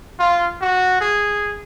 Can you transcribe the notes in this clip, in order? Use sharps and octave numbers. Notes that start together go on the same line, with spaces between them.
F4
F#4
G#4